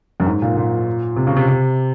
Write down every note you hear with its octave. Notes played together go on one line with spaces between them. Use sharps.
F#2
G#2
A#2
A#2
C3
C#3
C3